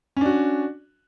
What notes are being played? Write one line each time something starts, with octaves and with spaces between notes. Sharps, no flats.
C#4 D4 F#4